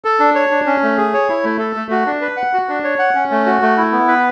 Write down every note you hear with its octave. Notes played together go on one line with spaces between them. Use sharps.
A4
D4
C#5
D4
C#4
A3
G#4
C#5
E4
A3
A4
A3
F#4
D4
B4
F#5
F#4
D4
C#5
F#5
C#4
A3
F#4
A3
E4
B3
B4